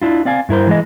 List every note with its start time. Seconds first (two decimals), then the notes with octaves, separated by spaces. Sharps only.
0.02 D4 E4 F4
0.25 C4 D5 F5 G#5
0.49 G2 E4 A#4 C5
0.67 E3 G#3 D#5